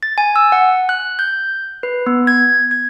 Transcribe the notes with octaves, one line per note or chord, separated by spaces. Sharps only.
A6
G#5
E6
F#5
F#6
G6
B4
B3
G#6
G#6